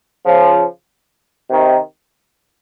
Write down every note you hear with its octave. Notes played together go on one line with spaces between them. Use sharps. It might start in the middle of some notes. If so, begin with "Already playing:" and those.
C#3 F3
C3 D#3